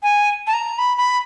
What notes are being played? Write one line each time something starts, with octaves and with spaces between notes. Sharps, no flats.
G#5
A5
A#5
B5
B5